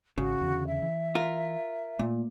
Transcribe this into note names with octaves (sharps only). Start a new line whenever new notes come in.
G#1 C#3 F#4
E2 D3
E5
E3
F4 A#4
A#2 A3 A#3